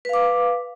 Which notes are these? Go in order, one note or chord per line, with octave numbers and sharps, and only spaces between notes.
B4 F5 D6